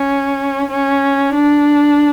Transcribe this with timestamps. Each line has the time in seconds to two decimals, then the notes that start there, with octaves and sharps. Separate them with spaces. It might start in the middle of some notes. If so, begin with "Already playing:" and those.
Already playing: C#4
0.70 C#4
1.34 D4